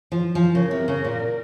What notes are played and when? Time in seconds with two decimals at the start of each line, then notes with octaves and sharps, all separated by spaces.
0.12 F3
0.35 F3
0.54 C#3 A#4
0.71 C3
0.88 C#3
1.04 A#2